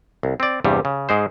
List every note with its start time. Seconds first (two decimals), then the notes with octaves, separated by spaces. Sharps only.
0.23 C2
0.40 C4 D5
0.64 E2 G2 C3 G3
0.85 C#3
1.09 G#2 G#3 C5